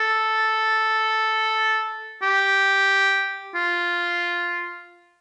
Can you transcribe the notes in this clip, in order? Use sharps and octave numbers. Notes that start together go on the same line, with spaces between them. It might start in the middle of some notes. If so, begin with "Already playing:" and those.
Already playing: A4
G4
F4